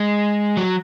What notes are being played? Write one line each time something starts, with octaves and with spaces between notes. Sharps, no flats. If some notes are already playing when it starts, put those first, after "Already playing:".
Already playing: G#3
F#3